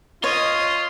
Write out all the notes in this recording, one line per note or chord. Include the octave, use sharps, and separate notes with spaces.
F4 C#5 D#5 C6 D#6